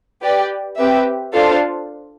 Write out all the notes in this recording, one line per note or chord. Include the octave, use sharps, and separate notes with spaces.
G4 B4 D5 G5
C4 G4 B4 E5
D4 F4 A4 C5 F5